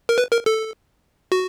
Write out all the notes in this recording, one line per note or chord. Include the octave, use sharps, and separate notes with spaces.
A#4
B4
A#4
A4
F#4